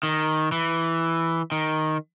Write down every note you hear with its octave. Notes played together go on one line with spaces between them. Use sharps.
D#3
E3
D#3